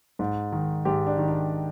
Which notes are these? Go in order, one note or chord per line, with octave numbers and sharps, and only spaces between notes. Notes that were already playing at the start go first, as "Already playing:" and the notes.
G#2
D#3
G#2 G4
D4
D#3
D4